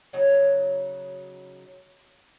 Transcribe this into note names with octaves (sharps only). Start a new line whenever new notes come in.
C#3 F#3 D#4